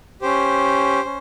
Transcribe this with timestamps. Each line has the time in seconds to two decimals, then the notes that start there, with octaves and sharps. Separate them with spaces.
0.22 C#4 G4 C5
1.05 C#4